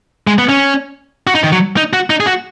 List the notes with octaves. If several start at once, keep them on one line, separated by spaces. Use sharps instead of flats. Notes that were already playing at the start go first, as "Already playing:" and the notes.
G#3
B3
C#4
F#4
D#4
D#3
F#3
D#4
F#4
D#4
G#4
F#4